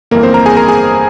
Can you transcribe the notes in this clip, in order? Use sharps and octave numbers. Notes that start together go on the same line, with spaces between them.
G1 F2 E3 A#3 A#4
C4 C5
A#4 A#5
G#4 G#5
A#4 A#5
G#4 G#5